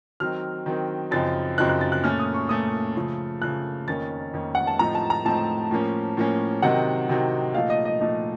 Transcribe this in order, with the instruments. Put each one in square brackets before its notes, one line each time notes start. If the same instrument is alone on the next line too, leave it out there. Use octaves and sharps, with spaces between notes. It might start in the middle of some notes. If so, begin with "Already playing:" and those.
[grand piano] D#3 F#3 C4 D#4 [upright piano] F6
[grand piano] D#3 F#3 C4 D#4
[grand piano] F#2 C#3 F3 C4 D#4 [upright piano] A6
[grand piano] F#2 C#3 F3 C4 D#4 [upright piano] F#6
[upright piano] F#6
A6
F#6
[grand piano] A#2 A3 C#4 [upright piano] F6
[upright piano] D#6
C#6
[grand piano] A#2 A3 C#4 [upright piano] D#6
[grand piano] C#3 F3 A3
[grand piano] C#3 F3 A3 [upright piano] F#6
[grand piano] F2 D#3 A#3 C#4 [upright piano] A6
[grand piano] F2 D#3 A#3 C#4
[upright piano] F#5
A5
[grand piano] A2 F3 A3 C4 D#4 [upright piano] A#5
[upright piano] A5
A#5
[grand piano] A2 F3 A3 C4 D#4 [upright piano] A5
[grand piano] A2 F3 A#3 C#4
A2 F3 A#3 C#4
[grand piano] C3 D#3 F#3 C4 D#4 [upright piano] F#5
[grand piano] C3 D#3 F#3 C4 D#4
[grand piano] A#2 F3 A3 D#4 [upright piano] F5
[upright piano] D#5
D#5
[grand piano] A#2 F3 A3 D#4 [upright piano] D#5